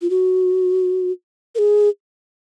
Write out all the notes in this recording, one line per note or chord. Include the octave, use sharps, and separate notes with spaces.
F4
F#4
A#4
G#4